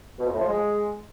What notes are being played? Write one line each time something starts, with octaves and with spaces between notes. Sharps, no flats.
B2
F2
A2
F3
G#3